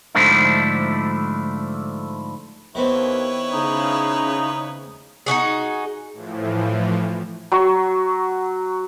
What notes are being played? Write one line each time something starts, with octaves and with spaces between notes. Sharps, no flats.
G#2 D3 F3 A3 D4 E4
D#2 D#3 B3 C4 E4 B4 C#5
C#3 D#4
D#4 E4 F#4 G#4
A2 E3 F3
F#3 C#6